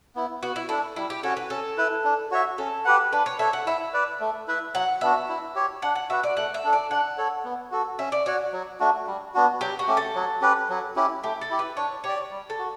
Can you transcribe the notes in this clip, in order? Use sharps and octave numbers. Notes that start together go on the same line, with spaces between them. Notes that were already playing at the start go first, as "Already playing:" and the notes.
B3 E4
B3 F#4
E4
D4 E4 A4
G3 E4
G4
C#4 F#4 A4 C#5
B4
C#4 A4
E4 B4
D4
F#4 C#5 E5
C#4 A4
G4 B4 F#5
D4 B4
C#5
A4 C#5 E5
F#5
E4 E5
B4 D5
A3
E4 B4 E5
F#3 F#5
B3 D4 F#4 E5
E4
G4 C#5
D4 F#5
F#5
F#4 B4 E5 F#5
D5
A3 F#5
E5
D4 A4
D5
D4 F#5
A4 C#5
B3
F#4 A4
C#4 E5
D5
F#4 C#5 D5 F#5
F#3
A3 D4 F#4
G3
B3 D4 F#4
F#3 G4
F#4
A3 C#4 G4
A4
F#3
C#4 G4 B4
F#3
C#4 E4 G4
A3 G4
A4
E4 G4
B4
D4 C#5
G4 C#5 D5
G3
A4
F#4